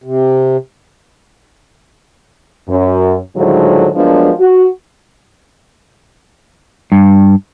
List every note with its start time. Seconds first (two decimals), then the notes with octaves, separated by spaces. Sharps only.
0.04 C3
2.69 F#2
3.36 A2 D3 D#3 F3 F#3 G#3
3.96 F3 F#3 G#3 A#3 B3 D4
4.40 F#4
6.92 G2